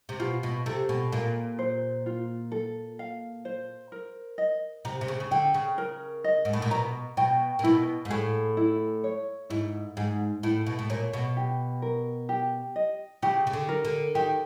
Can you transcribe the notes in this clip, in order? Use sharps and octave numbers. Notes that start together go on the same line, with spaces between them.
C3
B2 F4
B2
C3 A4
B2
A#2 F5
C5
F4
A4
F5
C5
A#4
D#5
C3 A#5
C3
C#3
C#3
D3 G5
C#3
A#4
D#5
G#2
A2
A#2
B2 A#5
B2 G5
A#2
B2 E4
G#2
A2 G#4
E4
C#5
G#2 E4
G#2 G#4
A2 E4
B2
A2
A#2 C#5
B2
G4
A#4
G4
D#5
C#3 G4
C#3
D3
A#4
D3
D#3 G4